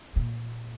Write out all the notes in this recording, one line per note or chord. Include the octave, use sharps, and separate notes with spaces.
A#2